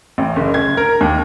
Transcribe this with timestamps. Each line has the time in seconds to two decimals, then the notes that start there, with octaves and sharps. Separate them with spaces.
0.18 A1
0.36 F#1
0.54 G#6
0.77 A#4
1.01 D#2